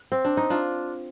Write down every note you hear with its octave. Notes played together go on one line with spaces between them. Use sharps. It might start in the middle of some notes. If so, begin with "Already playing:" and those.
Already playing: A#3
C4
D4
D#4
D4 F4